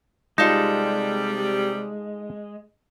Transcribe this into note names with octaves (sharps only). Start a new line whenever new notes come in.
C3 G3 G#3 D#4 F4 A4